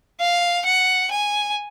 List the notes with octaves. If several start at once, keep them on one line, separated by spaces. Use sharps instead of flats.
F5
F#5
G#5